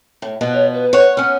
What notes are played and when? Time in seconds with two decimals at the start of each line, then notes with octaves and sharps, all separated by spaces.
0.22 A2
0.41 B2 F3 B3
0.53 C#5
0.73 B4
0.93 C#5 F#5
1.17 B3 C#4 F6